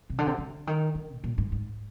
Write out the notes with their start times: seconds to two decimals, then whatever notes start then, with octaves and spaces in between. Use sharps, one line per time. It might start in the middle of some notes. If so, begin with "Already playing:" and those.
0.10 C3
0.18 D3
0.27 C3
0.38 D3
0.67 D#3
0.95 D3
1.16 G#2
1.24 A#2
1.38 G#2
1.52 G#2